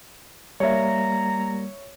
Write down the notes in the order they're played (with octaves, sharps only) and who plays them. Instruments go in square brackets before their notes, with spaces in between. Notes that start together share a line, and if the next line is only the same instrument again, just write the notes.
[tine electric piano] G3 A#3 [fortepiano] C#5 E5 [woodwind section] A#5